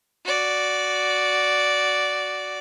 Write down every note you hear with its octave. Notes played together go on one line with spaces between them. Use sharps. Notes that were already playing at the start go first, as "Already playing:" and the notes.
F#4 D5